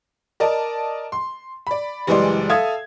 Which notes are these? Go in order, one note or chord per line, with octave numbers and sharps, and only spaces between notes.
A#4 D5 D#5 A5
C6
D5 B5
F#1 E3 G3 G#3 D5 C6
A4 E5 F5 D#6 G#6